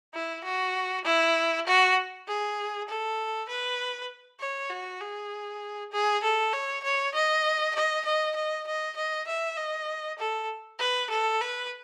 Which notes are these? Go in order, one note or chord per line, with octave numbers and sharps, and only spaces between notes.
E4
F#4
E4
F#4
G#4
A4
B4
C#5
F#4
G#4
G#4
A4
C#5
C#5
D#5
D#5
D#5
D#5
D#5
D#5
E5
D#5
A4
B4
A4
B4